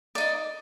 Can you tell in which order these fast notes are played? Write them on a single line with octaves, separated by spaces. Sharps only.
D5 D#4 D#5